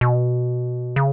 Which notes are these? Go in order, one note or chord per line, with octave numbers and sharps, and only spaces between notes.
B2
C#3